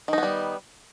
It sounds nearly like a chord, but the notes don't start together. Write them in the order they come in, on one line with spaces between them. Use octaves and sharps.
D#3 D#4 B3 G3